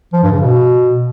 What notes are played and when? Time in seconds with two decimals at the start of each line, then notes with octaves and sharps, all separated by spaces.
0.13 F3
0.23 G2
0.32 C#3
0.42 B2